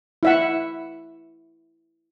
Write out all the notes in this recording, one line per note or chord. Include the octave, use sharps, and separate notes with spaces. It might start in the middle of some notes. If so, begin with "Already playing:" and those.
E4 E5 F#5